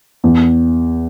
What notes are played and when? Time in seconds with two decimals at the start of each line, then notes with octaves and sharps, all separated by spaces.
0.24 E2